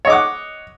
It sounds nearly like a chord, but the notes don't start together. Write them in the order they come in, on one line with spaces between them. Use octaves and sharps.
C#5 D#5 D6 F#5